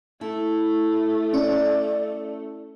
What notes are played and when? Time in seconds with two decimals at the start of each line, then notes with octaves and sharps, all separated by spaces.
0.21 A3 E4 A5
1.34 C#4 D5